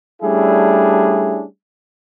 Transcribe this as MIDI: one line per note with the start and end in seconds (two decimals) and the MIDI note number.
0.22 1.44 55
0.22 1.44 57
0.22 1.44 61
0.22 1.44 62
0.22 1.44 64
0.22 1.44 68